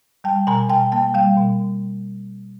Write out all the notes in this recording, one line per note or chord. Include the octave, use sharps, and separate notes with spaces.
G3 G5 A5
B2 G#5 A#5
B2 G5 A5
A#3 G5 A5
G3 F5 G5
B2